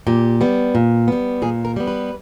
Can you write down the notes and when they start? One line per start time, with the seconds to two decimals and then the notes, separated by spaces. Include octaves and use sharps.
0.07 A#2 G4
0.41 G3 B3
0.75 A#2
1.08 G3 B3
1.42 A#2 G#4
1.65 A#4
1.76 G3 B3
1.87 B4